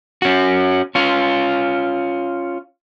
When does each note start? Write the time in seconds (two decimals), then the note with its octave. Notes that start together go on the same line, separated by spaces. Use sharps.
0.22 C#4 F#4
0.95 C#4 F4